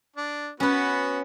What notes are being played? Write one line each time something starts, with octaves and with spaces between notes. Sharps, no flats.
D4
B3 C#4 F#4 B4